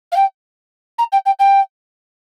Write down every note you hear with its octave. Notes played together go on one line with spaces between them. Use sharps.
F5
G5
A#5
G5
G5
G5